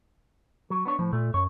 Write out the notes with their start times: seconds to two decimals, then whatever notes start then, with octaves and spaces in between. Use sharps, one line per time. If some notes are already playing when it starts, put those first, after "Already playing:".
0.70 F#3
0.85 B3 D4 C#5
0.99 A2 F3
1.13 A#2 A3
1.34 F#2 C#5